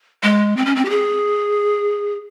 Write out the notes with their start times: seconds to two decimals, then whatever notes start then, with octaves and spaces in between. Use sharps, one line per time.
0.23 G#3
0.57 C4
0.66 C#4
0.76 C4
0.85 G4
0.90 G#4